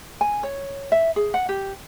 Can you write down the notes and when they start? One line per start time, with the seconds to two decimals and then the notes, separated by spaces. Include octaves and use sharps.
0.21 G#5
0.43 C#5
0.92 E5
1.16 G#4
1.34 F#5
1.49 G4